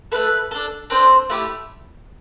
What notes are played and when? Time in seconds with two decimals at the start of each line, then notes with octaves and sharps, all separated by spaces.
0.12 A3 D4 A4 B4
0.51 D4 A4
0.90 C4 D4 A4 C5
1.30 A3 E4 G4